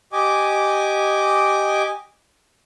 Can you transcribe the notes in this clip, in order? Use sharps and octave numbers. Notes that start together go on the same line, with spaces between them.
G4 D#5 G#5 D6